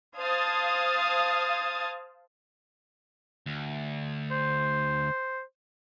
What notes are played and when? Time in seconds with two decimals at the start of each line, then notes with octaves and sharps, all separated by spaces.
0.19 C5 F5 A5 D#6 G#6 A6
3.46 D2
4.31 C5